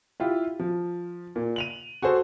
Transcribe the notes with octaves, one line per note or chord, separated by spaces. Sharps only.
E4 F4 G4
F3
A#2
D#7 F7 F#7
F#4 G#4 A4 C5